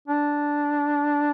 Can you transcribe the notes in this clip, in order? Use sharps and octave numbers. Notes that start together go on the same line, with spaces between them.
D4